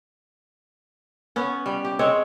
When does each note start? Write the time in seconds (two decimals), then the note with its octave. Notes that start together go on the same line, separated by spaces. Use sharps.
1.36 B3 C#4
1.66 G3
1.85 G4
1.99 G#3 C4 C#5